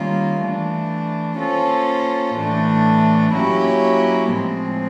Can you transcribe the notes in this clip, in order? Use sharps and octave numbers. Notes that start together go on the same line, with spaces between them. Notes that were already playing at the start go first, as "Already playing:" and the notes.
Already playing: D#3 G3 A#3 C#4 F4
E3 A3 D4
A#3 C#4 F4 A4 C5
A2 E3 A3 D4
F#3 A#3 C#4 E4 G4
A2 F3 G#3 C4